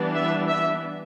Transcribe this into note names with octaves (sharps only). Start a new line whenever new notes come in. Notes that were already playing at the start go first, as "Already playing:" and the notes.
Already playing: E3 G3 B3 D4
E5
E5